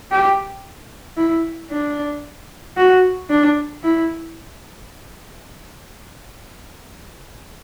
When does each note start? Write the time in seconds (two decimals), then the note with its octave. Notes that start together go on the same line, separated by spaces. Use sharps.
0.11 G4
1.17 E4
1.70 D4
2.77 F#4
3.30 D4
3.83 E4